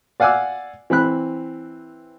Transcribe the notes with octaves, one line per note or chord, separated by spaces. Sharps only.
D5 F5 F#5 G#5 D6 E6
E3 C4 B5 F#6